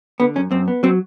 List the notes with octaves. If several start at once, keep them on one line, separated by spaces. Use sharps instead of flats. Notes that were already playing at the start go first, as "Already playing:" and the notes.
D3 B3
F#2 C#4
F#2 C4
B3
F#3 C4